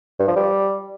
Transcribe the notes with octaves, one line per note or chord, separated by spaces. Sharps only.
G2
F3
G3